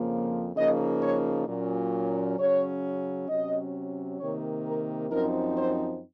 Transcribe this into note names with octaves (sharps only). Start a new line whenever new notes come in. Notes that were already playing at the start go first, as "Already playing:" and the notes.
Already playing: F2 C#3 F3 A#3
C#3 F3 A#3 D#4 D#5
C#5
A#2 F#3 C#4
C#3 F#3 C#4 C#5
C3 F#3 C#4 D#5
C3 D#3 A#3 C#5
A#4
F#2 F3 C4 D#4 A#4
C5